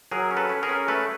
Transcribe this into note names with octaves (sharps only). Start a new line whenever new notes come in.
F#3 G#4 A#4
C#4
A4 B4
C#4
G#4 A#4
C#4
A3 A4 B4